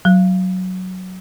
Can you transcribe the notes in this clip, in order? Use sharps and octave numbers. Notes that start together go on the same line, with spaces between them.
F#3